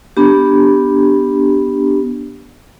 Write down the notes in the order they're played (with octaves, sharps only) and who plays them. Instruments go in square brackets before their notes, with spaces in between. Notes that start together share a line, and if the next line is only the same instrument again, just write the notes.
[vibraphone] B3 D4 G4